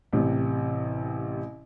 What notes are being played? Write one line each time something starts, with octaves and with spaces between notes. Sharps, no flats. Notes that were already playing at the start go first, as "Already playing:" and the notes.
A1 C3